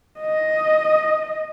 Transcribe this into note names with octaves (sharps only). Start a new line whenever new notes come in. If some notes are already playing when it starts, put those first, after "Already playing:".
D#5